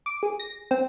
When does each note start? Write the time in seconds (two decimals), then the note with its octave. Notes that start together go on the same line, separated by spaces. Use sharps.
0.06 D6
0.23 G#4
0.39 A#6
0.71 C4